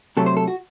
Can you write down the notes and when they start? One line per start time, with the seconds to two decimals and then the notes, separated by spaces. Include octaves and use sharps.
0.17 C3 F#3 A3 A4
0.26 C5
0.37 A4
0.48 F#4